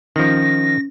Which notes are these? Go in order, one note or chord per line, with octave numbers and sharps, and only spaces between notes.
D#3 F3 C#4 A#6